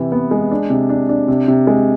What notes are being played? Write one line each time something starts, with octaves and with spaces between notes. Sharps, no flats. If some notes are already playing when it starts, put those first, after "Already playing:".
Already playing: C3 E3 E4
B3
G#3
D4
C3
D4
D4
C3
C3
G#3